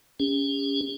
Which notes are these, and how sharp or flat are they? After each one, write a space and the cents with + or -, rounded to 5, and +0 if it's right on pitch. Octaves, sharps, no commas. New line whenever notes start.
C#4 +20 G4 +45